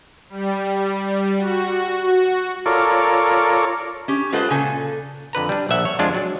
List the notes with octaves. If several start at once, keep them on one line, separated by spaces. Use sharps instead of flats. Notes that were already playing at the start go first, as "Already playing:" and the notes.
G3
F#4
F4 A4 A#4 C#5 D5
C#4 G4
G#3 F4 A4 B4 C5 F#5
A#2 C#3 A4 G#5
F2 D3 B4 A#5
G3 D4
A#1 G3 E5 F#5
C#5
F2 F3 G#3 D4 F4
F#3 D4